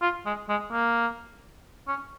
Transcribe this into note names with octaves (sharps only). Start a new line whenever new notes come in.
F4
G#3
G#3
A#3
C#4